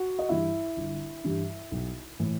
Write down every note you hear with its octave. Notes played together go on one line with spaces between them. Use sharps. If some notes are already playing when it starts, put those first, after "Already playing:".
Already playing: F#4 F#5
D#5
G2 E3 G3 E4 E5
G1
G2 E3 G3
B1
A2 E3